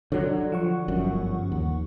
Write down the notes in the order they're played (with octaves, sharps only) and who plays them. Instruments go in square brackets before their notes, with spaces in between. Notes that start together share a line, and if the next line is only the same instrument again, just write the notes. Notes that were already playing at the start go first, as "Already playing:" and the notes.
[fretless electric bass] D3 F#3 [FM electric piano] C#5
[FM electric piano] F3 F#5 C#6
[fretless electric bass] G1 F#2
D#2